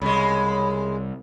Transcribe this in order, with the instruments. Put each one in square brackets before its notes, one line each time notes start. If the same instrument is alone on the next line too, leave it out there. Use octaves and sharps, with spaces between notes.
[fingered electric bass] C2 [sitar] C#3 G#3 [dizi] B5